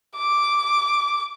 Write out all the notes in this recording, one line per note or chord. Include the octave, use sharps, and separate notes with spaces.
D6